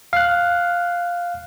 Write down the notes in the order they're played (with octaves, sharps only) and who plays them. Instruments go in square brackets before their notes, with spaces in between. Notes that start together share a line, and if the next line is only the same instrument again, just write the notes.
[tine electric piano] F5 F#6